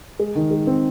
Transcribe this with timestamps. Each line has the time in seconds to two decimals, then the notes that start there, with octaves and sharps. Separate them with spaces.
0.19 G#3
0.35 D#3
0.51 G#3
0.67 C4